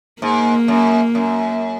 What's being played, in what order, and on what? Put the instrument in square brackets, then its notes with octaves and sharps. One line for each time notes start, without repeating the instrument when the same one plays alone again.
[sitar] G#2 [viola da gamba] A#3
[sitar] F#2
F#2